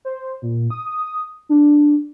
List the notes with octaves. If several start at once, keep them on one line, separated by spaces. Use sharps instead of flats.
C5
A#2
D#6
D4